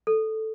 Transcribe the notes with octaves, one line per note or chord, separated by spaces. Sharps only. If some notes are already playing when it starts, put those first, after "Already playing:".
A4